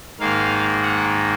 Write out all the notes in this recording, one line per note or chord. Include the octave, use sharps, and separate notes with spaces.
G#2 D#3 A#3 F5
F#5